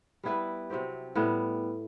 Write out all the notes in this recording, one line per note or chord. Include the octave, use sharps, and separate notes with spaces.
G3 B3 E4 B4
C3 F#3 C4 G4
A2 G3 B3